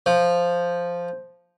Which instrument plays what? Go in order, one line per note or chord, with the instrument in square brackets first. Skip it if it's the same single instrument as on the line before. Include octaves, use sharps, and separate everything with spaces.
[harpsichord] F3 [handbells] C5